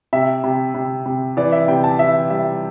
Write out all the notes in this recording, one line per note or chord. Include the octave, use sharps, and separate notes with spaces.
C3 E5
C3
C3
C3
E3 D5
E5
C3 G5
A5
E3 E5
G3 E5